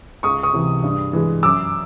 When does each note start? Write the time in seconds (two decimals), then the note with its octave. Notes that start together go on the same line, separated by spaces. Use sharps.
0.23 C#2 C#6 D#6
0.43 C#6 D#6
0.53 C3 E3
0.83 G2
1.13 E3 G#3
1.43 F#2 D6 E6